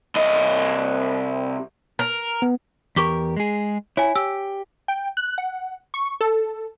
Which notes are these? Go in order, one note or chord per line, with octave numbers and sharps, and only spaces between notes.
C2 D#5
A#4
B3
E2 G4 A#4 C#6 D6 B6
G#3 G#4
E4 C#5 G#5
G4 E6
G5
F#6
F#5
C#6
A4